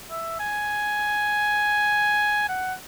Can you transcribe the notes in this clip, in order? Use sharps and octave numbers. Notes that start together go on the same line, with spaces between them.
E5
G#5
F#5